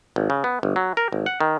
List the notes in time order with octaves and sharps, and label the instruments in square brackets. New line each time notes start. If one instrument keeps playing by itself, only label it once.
[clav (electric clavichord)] G#1
C#3
B3
G1
F#3
A#4
G#1
F#5
D#3